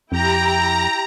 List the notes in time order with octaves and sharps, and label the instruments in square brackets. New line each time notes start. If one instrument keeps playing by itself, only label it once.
[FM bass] F2 [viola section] E4 G4 G5 [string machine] A#5